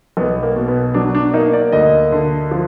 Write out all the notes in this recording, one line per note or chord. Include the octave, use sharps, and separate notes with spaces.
B1 B3
A#3
B2
B3
F#3 D4
D4
A#3 D#4
D5
D2 D#5
D3
F3